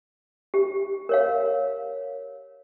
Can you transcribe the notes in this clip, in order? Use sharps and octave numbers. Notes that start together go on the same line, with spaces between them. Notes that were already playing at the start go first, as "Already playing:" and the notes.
G4
A#4 C#5 F5